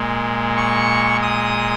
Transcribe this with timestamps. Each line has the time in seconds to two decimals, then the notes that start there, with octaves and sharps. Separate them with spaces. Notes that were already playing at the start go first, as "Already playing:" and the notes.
Already playing: A#2 G#3
0.57 C#6
1.22 D#6